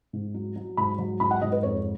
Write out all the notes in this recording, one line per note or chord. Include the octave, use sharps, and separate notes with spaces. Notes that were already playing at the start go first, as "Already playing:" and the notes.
G#2
F#3
F#3
G#2 B5
F#3
G#2 B5
F#5
G#2 D#5
B4
F2 C#5